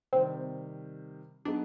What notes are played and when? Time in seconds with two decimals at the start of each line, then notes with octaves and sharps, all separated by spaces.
0.13 C3 D#3 G3 C4
1.45 F#3 B3 D4 D#4 G#4 B4